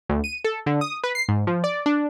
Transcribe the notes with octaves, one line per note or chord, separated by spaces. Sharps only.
D2
D#7
A4
D3
D#6
B4
C7
G#2
F3
D5
D4